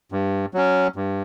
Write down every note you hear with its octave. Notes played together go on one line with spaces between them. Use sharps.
G2
F#3 C#4
G2